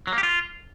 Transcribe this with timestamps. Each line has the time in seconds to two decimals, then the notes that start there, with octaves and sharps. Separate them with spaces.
0.07 F#3
0.13 A#3
0.18 G4
0.23 F4